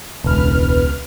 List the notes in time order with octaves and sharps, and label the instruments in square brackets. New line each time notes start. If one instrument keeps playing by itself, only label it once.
[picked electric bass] E1 [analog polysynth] C#2 B4 F6